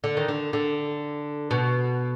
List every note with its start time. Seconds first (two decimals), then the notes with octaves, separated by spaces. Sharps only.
0.04 D3
0.17 D#3
0.28 D3
0.53 D3
1.51 B2